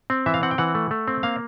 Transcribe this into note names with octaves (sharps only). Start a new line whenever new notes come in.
C4
E3 E5
F5
C4 F#5
G5
E3 F#5
A3
A3
C4
A#3 F5